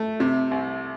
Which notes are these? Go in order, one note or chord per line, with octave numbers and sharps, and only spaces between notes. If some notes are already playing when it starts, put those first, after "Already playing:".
Already playing: A3
C3
C2